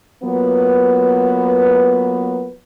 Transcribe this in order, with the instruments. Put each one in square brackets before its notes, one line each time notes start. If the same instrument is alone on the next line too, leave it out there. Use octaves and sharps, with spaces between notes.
[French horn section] F#3 A#3 B3 F4 B4